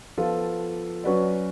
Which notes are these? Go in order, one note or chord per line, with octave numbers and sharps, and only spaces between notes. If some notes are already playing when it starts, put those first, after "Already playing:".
F3 B3 F4 A4
F#3 C#4 F#4 B4 D5